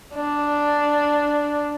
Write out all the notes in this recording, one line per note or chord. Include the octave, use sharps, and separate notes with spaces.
D4